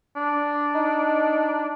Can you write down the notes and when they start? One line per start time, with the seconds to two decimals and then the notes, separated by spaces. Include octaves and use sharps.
0.16 D4
0.75 D#4